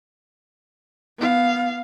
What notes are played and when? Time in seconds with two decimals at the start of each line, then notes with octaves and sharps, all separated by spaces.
1.18 B3 F5